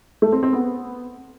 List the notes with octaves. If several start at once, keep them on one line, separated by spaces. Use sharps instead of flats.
A3
C4
C4
B3